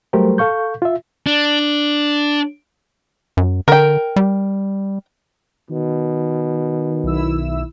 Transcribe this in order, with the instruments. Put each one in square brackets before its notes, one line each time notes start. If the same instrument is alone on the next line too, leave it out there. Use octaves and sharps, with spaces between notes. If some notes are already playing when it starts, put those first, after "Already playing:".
[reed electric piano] F#3 G3 A3 G4 A#4 C5
A4 F5 C#6 G6
F4 E5
[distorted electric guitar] D4
[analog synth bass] F#2
[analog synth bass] D3 [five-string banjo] A#4 G5
[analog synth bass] G3
[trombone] B2 [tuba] D#3
[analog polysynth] B1 E4 E6